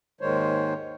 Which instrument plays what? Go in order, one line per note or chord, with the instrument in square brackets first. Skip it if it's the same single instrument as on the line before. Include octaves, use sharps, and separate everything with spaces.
[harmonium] D#2 G#2 D#3 G#3 C5 C#5